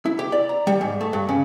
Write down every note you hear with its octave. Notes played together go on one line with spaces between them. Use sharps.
E4
G4
D5
A#5
G3
G#2
A3
G2
C#3